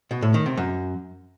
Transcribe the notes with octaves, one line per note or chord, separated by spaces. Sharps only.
B2
A2
D#3
C3
F#2